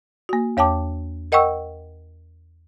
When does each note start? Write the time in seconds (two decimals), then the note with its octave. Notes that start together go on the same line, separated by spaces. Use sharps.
0.29 A#3 F#4
0.57 E2 C#5 G5 A5 D6
1.32 A#4 D#5 F#5 G5 C#6 E6